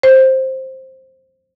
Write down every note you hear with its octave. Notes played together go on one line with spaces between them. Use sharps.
C5